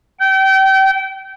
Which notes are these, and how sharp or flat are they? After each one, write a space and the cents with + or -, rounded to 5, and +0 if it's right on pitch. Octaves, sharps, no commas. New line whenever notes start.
G5 -30